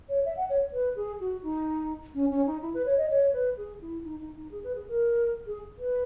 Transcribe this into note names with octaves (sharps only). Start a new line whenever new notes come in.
C#5
E5
F#5
C#5
B4
G#4
F#4
D#4
C#4
C#4
D#4
E4
B4
C#5
D#5
C#5
B4
G#4
E4
D#4
D#4
D#4
G#4
B4
G#4
A#4
G#4
B4